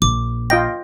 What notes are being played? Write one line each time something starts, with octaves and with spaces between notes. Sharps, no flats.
A#1 D6
F4 D#5 G5 A#6